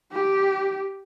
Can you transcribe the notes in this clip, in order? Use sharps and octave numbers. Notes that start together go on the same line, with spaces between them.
G4